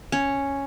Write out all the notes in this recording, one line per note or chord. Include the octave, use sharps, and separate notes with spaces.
C#4